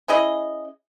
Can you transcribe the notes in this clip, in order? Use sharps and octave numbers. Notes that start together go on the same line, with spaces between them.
C#4 E4 G#4 D#5